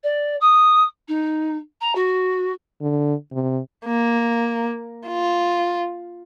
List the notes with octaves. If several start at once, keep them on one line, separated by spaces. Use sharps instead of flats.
D5
D#6
D#4
A#5
F#4
D3
C3
A#3
F4